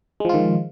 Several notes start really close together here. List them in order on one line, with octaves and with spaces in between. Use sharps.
G#3 F3 F4 D#3